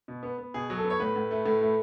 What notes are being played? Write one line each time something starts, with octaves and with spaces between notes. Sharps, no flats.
B2
B3
B3
B2 G#4
F#3
A4
B3
C#5
A2 B4
A2
A3
A2
A3